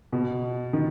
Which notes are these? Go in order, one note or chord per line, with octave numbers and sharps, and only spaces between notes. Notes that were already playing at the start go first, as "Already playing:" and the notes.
B2
D#3